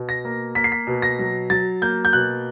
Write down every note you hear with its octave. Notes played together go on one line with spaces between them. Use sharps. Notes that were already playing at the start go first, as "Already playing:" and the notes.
Already playing: B2
A#6
A#3
A#3 B6
C7
B6
B2
A#6
F#3
F#3 A6
A#3 G6
G6
B2 F#6